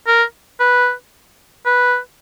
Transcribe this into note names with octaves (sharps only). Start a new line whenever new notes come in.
A#4
B4
B4